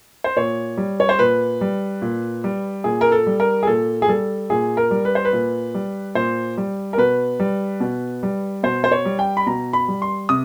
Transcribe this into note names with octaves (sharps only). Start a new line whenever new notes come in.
C5
A#2 C#5
G3
C#5
C5
A#2 B4
G3
A#2
G3
A#2 G#4
A#4
A4
G3
A#4
G#4
A#2 A4
G#4
G3 A4
A#2 G#4
A#4
G3
B4
C5
B4
A#2
G3
A#2 C5
G3
A#4
B2 B4
G3
B2
G3
B2 C5
C5
C#5
G3
G5
B5
B2 A#5
B5
G3
C6
C3 D#6